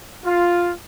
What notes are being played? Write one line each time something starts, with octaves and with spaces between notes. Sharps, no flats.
F4